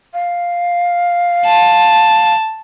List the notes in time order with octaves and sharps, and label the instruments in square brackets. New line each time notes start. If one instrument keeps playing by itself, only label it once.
[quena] F5
[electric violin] A5